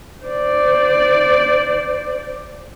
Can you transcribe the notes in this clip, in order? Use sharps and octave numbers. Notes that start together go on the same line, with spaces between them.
C5 D5